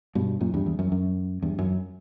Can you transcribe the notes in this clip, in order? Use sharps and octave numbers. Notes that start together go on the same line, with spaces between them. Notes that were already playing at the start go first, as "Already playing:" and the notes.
G2 B2
F#2 A#2
E2 G2
E2
F#2
F#2
E2 G2
F#2